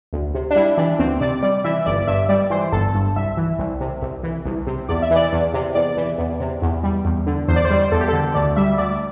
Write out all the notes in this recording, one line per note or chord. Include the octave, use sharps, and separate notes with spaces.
D2
C3
D4
G3 E4
E3 D4
D2 C4
C3 D5
G3 D5
E3 E5
G1 D5
G2 E5
G3 D5
E3 C5
G1 A4
G2
C2 E5
E3
C2
C3
C2
E3
C2
C3
E2 D5
E5
E3 D5
E2
C3
E2 D5
E3
E2
C3
E2
G3
E2
D3
E2 C5
D5
C5
G3 D5
C5
E2 A4
G4
D3 A4
D2 D5
G3 E5
D2 D5